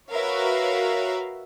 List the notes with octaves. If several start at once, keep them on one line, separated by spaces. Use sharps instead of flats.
F#4 A#4 B4 C#5 E5 F5